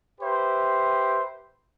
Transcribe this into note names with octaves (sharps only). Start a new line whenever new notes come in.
G4 B4 C5 E5